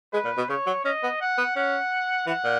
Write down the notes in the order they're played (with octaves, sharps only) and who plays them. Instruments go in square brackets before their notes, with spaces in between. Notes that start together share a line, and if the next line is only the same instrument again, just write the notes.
[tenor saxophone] G#3 [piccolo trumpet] B4
[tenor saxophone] A#2
B2
[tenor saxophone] C#3 [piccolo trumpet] C#5
[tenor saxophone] F#3
[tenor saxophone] C#4 [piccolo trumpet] D#5
[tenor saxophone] B3
[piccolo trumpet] F#5
[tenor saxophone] B3
[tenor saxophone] C#4 [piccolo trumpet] F#5
[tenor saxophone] E3 [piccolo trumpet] F#5
[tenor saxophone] A#2